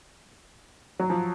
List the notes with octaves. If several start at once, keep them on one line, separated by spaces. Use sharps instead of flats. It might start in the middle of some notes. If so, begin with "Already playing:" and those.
F#3
F3